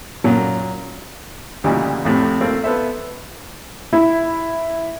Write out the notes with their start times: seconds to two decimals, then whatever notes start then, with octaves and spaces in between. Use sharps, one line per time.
0.24 F#2 A#2 F#3
1.64 D2 A#2 C#3 E3 G3 D#4
2.05 F2 A2 C3
2.41 A3 A#3 C4
2.64 B3 A4 C5 E5
3.93 E4